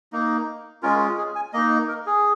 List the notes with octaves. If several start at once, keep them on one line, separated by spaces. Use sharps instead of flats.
A#3 D#4
G#3 C#4 F4 A#4
G#4
G#5
A#3 D#4 D#5
A#4
G#4